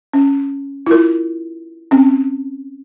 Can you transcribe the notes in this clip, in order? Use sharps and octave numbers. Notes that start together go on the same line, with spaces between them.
C#4
E4 F4 A#4
C4 C#4